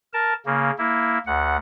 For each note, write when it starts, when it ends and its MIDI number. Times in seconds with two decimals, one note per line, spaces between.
0.13 0.33 70
0.13 0.33 81
0.46 0.71 49
0.46 0.71 58
0.78 1.18 58
0.78 1.18 64
1.26 1.57 38
1.26 1.57 78